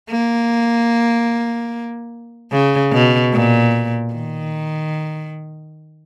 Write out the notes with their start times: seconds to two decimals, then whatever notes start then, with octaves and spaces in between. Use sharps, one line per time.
0.11 A#3
2.52 C#3
2.93 B2
3.33 A#2
4.14 D#3